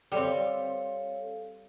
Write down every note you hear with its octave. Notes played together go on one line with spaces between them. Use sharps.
G3 C4 A4 C#5 F5